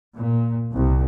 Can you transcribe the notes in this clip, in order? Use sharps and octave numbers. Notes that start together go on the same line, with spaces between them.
A#2
C2